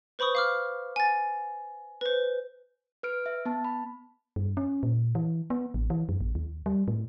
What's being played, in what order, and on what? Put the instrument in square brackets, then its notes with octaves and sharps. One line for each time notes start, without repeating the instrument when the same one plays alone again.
[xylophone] B4 C5 B5 C#6 D#6
F5 D6 F6
G#5 A6
B4 C5
[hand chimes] B4 F6 D7
E5
B3 A5
B5
[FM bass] G2
C#4
A#2
E3
B3
A1
E3
F#2
A1
D#2
G3
A2